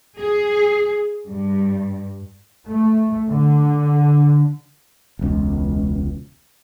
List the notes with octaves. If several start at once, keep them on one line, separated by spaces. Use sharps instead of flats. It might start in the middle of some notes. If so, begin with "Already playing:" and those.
G#4
G2
A3
D3
E1 C#2